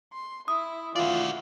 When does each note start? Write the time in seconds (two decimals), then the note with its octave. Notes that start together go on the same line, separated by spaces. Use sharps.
0.13 C6
0.48 E4 D#6
0.96 E3 F4 F#4 D5